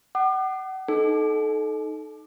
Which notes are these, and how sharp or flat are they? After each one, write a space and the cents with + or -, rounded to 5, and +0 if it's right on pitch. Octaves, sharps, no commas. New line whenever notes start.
F#5 +35 D6 +40
D#4 +0 A4 -20